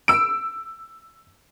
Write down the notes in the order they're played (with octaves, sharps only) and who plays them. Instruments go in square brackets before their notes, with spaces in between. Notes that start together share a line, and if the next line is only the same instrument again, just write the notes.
[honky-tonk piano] E6 D7